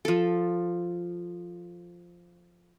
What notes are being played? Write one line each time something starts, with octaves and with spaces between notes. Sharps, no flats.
F3 A4